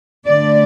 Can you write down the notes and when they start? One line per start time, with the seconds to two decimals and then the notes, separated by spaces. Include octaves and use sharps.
0.25 D3 A3 D5